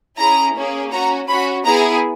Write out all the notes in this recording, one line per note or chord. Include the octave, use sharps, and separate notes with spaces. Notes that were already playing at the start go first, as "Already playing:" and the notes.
C#4 E4 G#4 A#5
A#3 C#4 G#4
C#4 F#4 A#5
C#4 F#4 B5
B3 E4 G#4 A#5